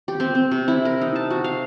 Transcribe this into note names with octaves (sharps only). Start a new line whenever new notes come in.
G4
C4
C4
C3
E4
A#4
D#4
A5
F#4
F5